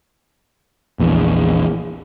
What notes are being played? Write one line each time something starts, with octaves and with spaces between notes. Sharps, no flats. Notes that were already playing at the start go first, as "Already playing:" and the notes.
A#1 E2